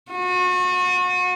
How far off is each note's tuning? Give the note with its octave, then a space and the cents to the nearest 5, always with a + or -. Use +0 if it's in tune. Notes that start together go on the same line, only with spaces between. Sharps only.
F#4 -35